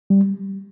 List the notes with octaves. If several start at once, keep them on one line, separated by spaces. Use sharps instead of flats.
G3